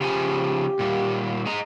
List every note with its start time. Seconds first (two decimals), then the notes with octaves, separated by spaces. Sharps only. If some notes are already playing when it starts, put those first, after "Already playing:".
0.01 C#3 F3 G4 G#5
0.79 A#2 G3
1.46 G#4 D#5 A#5